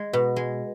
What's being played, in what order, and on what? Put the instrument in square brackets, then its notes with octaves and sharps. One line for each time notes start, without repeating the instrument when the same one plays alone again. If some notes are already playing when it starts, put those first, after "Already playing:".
Already playing: [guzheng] G#3
B2
G#3